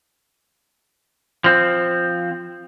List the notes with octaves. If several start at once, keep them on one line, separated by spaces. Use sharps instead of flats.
F3 C4